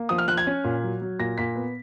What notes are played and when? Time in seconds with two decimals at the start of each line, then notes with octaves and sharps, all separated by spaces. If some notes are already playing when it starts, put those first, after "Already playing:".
Already playing: A#3
0.09 F3 D#6
0.18 F6
0.28 F3 F#6
0.37 G#6
0.47 C#4
0.64 A#2
0.84 F#3
1.02 F#3
1.19 A#2 A#6
1.38 A#2 B6
1.56 B3